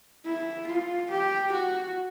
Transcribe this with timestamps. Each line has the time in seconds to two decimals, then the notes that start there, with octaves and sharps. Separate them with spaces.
0.25 E4
0.67 F4
1.10 G4
1.52 F#4